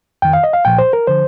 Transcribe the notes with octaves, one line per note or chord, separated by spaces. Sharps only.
F2 D#3 G5
F5
D#5
F5
C2 A#2 F3 G5
C5
A#4
D3 F3 C5